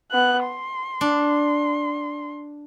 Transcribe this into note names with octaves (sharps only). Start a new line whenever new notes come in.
B3 F#6
C6
D4